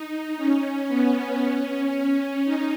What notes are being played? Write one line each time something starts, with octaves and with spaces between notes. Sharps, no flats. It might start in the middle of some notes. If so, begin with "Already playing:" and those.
Already playing: D#4
C#4
B3
C#4
D#4